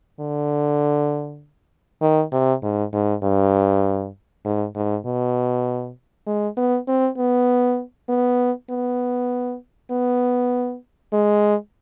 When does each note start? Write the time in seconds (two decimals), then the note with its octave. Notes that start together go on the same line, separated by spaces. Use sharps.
0.20 D3
2.02 D#3
2.32 C3
2.63 G#2
2.93 G#2
3.23 G2
4.45 G#2
4.76 G#2
5.05 B2
6.27 G#3
6.57 B3
6.88 C4
7.18 B3
8.09 B3
8.70 B3
9.91 B3
11.13 G#3